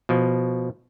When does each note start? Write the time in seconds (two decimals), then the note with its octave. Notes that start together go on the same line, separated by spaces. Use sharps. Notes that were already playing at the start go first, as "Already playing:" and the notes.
0.09 B2 F3